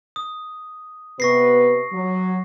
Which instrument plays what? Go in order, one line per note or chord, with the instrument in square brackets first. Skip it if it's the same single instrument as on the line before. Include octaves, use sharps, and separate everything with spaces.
[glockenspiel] D#6
[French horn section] C3 B3 B4 [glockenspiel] C#6 A#6 C7
[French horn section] F#3